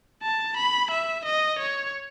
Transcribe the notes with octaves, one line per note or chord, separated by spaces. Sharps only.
A5
B5
E5
D#5
C#5